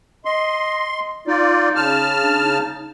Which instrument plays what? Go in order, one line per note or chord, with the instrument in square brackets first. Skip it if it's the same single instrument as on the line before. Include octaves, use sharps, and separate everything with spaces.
[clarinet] D#5 [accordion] C6
[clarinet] D#4 [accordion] F4 D5
[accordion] C#3 A5 F6
[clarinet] D4
D#4